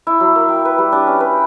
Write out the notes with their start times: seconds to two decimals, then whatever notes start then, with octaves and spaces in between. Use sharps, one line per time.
0.07 E4
0.20 F#3
0.36 A#3
0.48 G5
0.65 B4
0.78 G3
0.92 D4
1.07 C#4
1.20 B4
1.33 G5